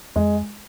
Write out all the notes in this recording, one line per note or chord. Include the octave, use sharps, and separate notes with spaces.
F2 G#3